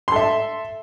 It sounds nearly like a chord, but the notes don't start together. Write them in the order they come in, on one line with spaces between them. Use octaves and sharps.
C6 A4 E5